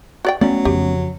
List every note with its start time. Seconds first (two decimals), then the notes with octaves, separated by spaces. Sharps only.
0.25 F#4 D5 G5
0.41 F#3 A3 B3 C#4 D5
0.65 F2 C#3 G4